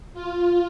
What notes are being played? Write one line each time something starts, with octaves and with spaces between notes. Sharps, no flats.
F4